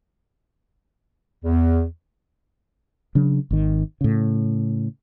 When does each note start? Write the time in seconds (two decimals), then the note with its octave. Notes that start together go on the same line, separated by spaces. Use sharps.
1.45 E2
3.15 C#3 F#3 D4
3.51 G#1 D#3
4.01 A2 C#3